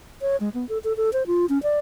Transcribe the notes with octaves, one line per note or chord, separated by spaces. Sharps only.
C#5
G#3
B3
A4
A4
A4
C5
F4
C#4
D5